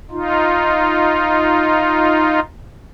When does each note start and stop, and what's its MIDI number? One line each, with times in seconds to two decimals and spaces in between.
0.11 2.40 63
0.11 2.40 65